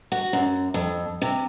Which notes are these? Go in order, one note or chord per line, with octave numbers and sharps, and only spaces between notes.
F#4
F#2
F2
C3